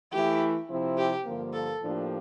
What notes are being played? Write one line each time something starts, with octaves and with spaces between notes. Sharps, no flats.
E3 A3 E4 G4
C3 F3 C4 E4
G4
G2 D3 F3 A#3
A4
A2 F3 A#3 D4 G4